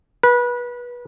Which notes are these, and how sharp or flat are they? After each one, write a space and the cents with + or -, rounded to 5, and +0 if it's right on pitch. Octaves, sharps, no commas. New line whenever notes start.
B4 -25